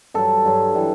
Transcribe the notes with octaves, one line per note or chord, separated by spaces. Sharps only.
G2 F#3 A4
G2 F#3
E3 G3